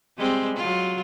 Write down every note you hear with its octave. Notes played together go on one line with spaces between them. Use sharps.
G3 G#3 C4
F#3 F4